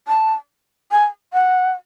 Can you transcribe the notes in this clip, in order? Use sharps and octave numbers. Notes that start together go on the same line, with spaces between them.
A5
G#5
F#5